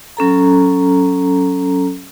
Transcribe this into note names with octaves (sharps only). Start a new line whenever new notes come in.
F#3 C#4 A4 A#5